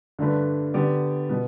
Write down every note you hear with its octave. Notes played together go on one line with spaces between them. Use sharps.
G2 D3 A3 D4 B4
D3 B3 G4 D5
B2 B3